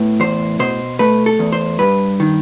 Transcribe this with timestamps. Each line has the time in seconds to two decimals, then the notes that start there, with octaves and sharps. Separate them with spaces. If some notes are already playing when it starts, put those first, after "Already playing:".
Already playing: A2 B3
0.20 E2 C5
0.59 B2 C5
0.99 A3 B4
1.26 A4
1.39 E2
1.52 C5
1.79 G2 B4
2.20 D#3